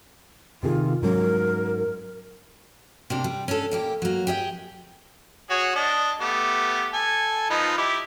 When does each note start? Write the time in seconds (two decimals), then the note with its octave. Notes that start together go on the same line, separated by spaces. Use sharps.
0.63 C3 D#3 F4 G#4
1.02 G#2 F#3 C#4 A#4
3.10 C3 A#3 D4
3.24 G3
3.48 C#4 D4 G#4 A4
3.71 A#2 A#3 G4
4.02 F#3 A#3
4.27 G4 G#4 D#5 G5
5.50 F#4 G#4 C#5
5.75 D4 D#5
6.21 A3 B3 G4
6.93 A4 G#5
7.50 F3 D#4 B4
7.78 E4 G4